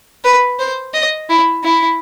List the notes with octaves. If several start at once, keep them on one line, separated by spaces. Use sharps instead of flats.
B4
C5
D#5
E4
E4